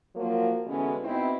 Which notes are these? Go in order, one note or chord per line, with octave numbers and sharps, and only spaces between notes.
F3 F#3 A#3
B2 D3 E3 G#3 C#4
B2 C4 D#4 E4